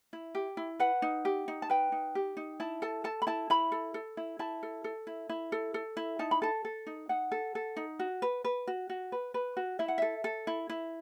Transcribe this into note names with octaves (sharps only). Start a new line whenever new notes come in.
E4
G4
E4
B4 F#5
D#4
G4
D#4
A5
B4 G5
D#4
G4
D#4
E4 A5
A4 A5
A4 A5
B5
E4 A5
E4 B5
A4
A4
E4
E4 A5
A4
A4
E4
E4
A4
A4
E4
D#4 A5
B5
A4 A5
A4
D#4
D#4 F#5
A4
A4
D#4
F#4
B4
B4
F#4
F#4
B4
B4
F#4
E4 E5
F#5
A4 E5
A4
E4
E4